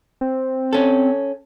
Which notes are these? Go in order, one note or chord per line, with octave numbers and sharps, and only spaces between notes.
C4
C#4 A4